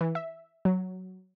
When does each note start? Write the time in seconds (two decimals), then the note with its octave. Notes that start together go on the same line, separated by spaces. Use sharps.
0.01 E3
0.15 E5
0.65 F#3